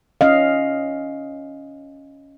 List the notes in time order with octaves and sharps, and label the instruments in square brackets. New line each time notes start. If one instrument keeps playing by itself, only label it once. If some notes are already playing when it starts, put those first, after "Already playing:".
[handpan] C#4 D#5 F5